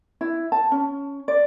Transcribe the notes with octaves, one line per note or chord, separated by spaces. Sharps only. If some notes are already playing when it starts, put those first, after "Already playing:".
E4
A5
C#4
D5